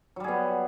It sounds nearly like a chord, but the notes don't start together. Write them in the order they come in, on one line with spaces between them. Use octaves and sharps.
F#3 G3 G#4 B3